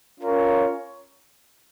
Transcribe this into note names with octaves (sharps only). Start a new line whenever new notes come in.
C#4 F4 A#4 C#5